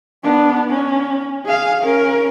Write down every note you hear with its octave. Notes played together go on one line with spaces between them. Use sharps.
B3 D4
C#4
G#4 F5
C#4 A#4